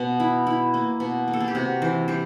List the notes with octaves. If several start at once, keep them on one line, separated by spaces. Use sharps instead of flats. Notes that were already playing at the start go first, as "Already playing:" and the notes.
Already playing: B2
E4
E4
A#3
B2
A#3
A4
G#4
G4
C3 F#4
E3 C5
G3 C5